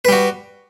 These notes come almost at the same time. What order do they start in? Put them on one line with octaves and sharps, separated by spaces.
B4 G3 F#4